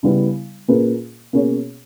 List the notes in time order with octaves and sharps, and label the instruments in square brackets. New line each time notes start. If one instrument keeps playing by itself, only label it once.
[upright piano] C#3 G3 B3 E4
A#2 A#3 C#4 G#4 B4
B2 A#3 C#4 G#4 C#5